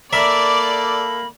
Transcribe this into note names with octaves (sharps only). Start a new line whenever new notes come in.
A#3 A4 A#4 D5 E5 B5